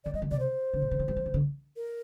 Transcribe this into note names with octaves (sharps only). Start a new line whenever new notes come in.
D#3 D5
G3 D#5
D#3
C3 D5
C5
D3
A#2
D3
D#3
G3
F3
D#3
D3
A#4